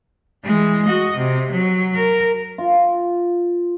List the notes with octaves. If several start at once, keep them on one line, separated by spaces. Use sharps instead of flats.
E3 G#3
F#4 D#5
C3
F#3
A#4
F4